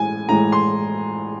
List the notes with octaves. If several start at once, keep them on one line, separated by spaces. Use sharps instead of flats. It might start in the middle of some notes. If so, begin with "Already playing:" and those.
Already playing: A2 E3 G#3 G#5
A2 E3 G#3 A#5
C6